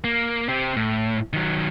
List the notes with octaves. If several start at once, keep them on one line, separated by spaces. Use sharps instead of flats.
A#3
C4 G4
A2
D#3 F#3